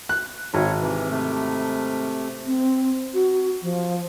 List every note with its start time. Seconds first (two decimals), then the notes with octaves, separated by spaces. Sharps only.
0.09 F#6
0.54 G#1 C4 C#5
0.81 C3 E3
1.10 C3 A3
2.47 C4
3.14 F#4
3.62 F3